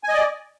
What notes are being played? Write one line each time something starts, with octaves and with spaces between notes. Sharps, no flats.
D5 D#5 G#5